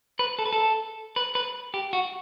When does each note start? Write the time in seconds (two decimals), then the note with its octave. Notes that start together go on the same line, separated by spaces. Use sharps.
0.19 B4
0.39 A4
0.46 B4
0.53 A4
1.16 B4
1.35 B4
1.74 G4
1.93 F#4